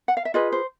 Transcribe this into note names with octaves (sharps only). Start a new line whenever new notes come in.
F#5
F5
E5
F4 G#4 B4 D#5
C5